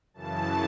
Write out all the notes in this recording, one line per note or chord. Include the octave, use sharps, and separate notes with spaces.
F#2 C#3 E3 A5